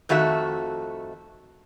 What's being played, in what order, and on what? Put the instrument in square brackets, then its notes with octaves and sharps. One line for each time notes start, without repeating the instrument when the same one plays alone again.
[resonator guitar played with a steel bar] F2 D#3 A3 F#4 E5